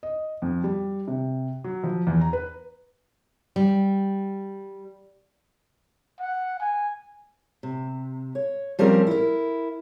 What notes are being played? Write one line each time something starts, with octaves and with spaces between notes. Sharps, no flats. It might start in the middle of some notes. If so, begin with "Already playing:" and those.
D#5
F2
G3
C3
F#3
F3
E2
A#5
B4
G3
F#5
G#5
C3
C#5
F3 G3 C4 C#4 A#4
E4 A#4